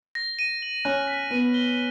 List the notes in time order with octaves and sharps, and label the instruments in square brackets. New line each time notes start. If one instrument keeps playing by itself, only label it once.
[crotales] A#6
D#7
F#7
[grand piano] C#4 [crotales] F#6
[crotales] B6
[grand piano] B3 [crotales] D#7
[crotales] G7